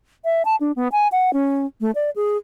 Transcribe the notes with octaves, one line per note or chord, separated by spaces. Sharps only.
E5
A5
D4
B3
G#5
F#5
C#4
A3
D5
G#4